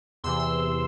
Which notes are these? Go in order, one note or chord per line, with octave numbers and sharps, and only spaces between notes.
E2 C3 E3 C6 E6
C6